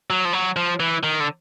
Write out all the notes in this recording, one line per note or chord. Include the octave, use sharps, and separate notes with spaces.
F#3
F3
F#3
F3
E3
D#3
D3